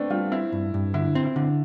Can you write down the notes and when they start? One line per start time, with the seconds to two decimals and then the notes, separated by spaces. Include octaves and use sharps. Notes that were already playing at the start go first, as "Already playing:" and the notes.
Already playing: A3 B3 C4 D4
0.10 G3 F4
0.32 C4 E4
0.52 G2
0.74 G2
0.94 D3 E4
1.15 C4
1.25 E4
1.36 D3